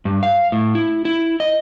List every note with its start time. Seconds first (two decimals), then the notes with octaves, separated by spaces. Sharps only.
0.05 G2
0.23 F5
0.52 A2
0.75 E4
1.05 E4
1.40 D#5